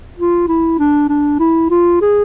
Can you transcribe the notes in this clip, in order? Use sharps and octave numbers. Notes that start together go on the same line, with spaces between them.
F4
E4
D4
D4
E4
F4
G#4